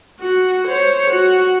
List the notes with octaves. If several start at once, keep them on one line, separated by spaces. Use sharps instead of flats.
F#4
C5 C#5
F#4